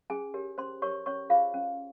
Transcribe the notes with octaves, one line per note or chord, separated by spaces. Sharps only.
C#4 G#4 G#5
G4 A#4 C#5
C#4 C5 C6
G4 A#4 C#5 C#6
C#4 C#5 C#6
F4 G#4 C5 F5
C#4